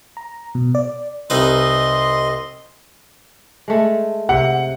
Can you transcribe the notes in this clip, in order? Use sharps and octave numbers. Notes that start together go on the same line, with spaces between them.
A#5
B2
D5
C2 D#4 B4 D#5 C6
G#3 A3
C3 F#5